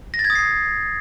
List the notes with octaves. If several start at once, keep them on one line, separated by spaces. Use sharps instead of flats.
A#6
A6
G#6
D#6
C7